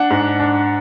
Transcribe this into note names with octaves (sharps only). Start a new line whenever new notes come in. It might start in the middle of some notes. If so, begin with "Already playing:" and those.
Already playing: D4 F#5
G#2
D4